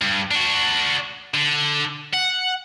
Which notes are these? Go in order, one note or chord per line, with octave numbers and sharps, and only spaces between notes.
G2
D4 F#4
D3
F#5